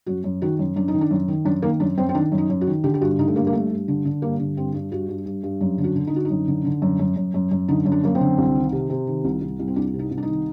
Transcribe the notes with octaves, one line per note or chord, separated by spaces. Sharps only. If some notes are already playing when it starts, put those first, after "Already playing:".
F#2 F#4
F#2
D#3 F#4
F#2
F#2 D4
D#4
D#3
D4
F#2
D#3
F#2 D4
D#3 A#3
F#2 D4
F#2 C4
C4
D#3 D4
F#2
D#4
F#2
F#4
D#3
D3 G4
G4
G2 F#4
D3 D#4
A3
G2 A#3
A#3
G2 A3
G2
D3
D3
G2 A#3
D3
G2 C4
G2
G2 F#4
G2
G2
G2
F#2
D3
F#4
D3
D#4
D3 F#4
D#4
F#2
D3
D3
F#2
F#2
F#2
F#2
F#2
D3 D#4
F#2
D4
F#2 A#3
C4
D3
C2
D#3
C3
C3
D#3
C2
C2
C2
C4
C2 D4
C3
D#4
C2
D4
D#4
D#3